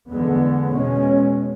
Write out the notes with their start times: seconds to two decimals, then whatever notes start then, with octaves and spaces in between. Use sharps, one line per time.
0.10 E2 D3 G#3 B3
0.71 B2 G#3 C#4